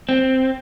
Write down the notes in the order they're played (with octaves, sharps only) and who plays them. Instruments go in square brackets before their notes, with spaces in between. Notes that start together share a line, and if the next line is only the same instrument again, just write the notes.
[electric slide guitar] C4